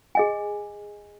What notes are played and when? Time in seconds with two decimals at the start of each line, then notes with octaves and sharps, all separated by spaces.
0.15 G#4 D#5 G#5